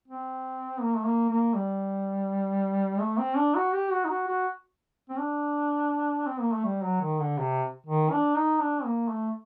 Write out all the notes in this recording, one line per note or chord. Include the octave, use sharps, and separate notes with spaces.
C4
A#3
A3
A#3
A#3
G3
A3
C4
D4
F#4
G4
F#4
D#4
F#4
F#4
C4
D4
C4
A#3
A3
G3
F#3
D#3
D3
C3
D#3
D4
D#4
D4
A#3
A3